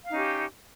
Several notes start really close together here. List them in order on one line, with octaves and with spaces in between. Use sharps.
F5 D#4 C#4 G4